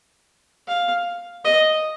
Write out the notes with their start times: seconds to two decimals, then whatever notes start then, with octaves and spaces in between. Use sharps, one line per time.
0.67 F5
1.45 D#5